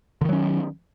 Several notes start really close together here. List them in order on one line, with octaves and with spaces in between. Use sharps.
D3 D#3 F#3 C#4